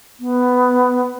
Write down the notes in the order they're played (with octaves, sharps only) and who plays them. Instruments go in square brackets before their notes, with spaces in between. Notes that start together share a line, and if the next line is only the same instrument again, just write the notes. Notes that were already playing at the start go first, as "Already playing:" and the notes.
[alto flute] B3